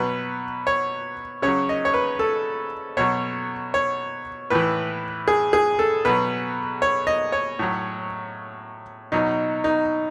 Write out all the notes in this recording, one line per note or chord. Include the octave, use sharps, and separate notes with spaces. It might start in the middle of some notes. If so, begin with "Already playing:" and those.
Already playing: B2 F#3 B4
C#5
C#3 F#3 C#5
D#5
C#5
B4
A4
B2 F#3 C#5
C#5
A2 E3 B4
G#4
G#4
A4
B2 F#3 B4
C#5
D#5
C#5
A2 F#3
B2 F#3 D#4
D#4